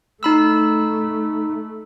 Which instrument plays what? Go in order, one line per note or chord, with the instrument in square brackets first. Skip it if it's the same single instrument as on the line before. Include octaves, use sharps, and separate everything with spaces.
[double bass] A3 [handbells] D#4 B5 E6